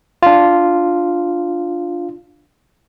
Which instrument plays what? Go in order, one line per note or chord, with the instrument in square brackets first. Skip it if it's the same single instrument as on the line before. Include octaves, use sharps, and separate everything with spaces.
[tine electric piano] D4 F4